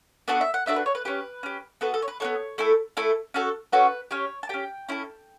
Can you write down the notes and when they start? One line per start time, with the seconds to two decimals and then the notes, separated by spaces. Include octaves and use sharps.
0.28 B3 D4 F#4 A4 D5
0.41 E5
0.54 F#5
0.66 B3 D4 F#4 A4 E5
0.76 B4
0.86 C#5
0.95 B4
1.05 C#4 G4 B4
1.43 C#4 G4
1.81 B3 F#4 A4 B4
1.94 A4
2.02 C#5
2.08 B4
2.20 B3 F#4 A4 C#5
2.58 A3 E4 A4
2.97 A3 E4 A4
3.34 C#4 F#4 A4
3.72 C#4 F#4 A4 B4
4.11 C#4 G4 C#5
4.43 A5
4.49 C#4 G4 G5
4.89 C#4 E4 A4